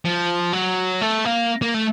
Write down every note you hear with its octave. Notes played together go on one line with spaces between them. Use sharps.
F3
F#3
A3
A#3
A#3
A3